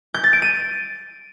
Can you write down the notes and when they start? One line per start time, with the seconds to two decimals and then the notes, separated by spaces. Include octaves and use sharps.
0.14 G6
0.24 A6
0.33 D7
0.42 D#7